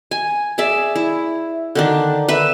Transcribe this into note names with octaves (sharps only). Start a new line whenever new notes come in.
G#5
G#4 D5 E5
E4
D3 D#3 D4
B4 E5